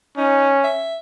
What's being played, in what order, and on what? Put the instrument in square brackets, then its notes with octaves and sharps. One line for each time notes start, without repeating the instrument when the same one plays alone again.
[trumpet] C#4 [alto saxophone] D#4
[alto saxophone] E5